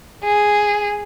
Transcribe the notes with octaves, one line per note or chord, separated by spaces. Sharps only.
G#4